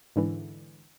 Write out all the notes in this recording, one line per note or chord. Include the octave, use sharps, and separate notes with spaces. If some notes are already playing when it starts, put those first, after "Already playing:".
G#2 D3 E3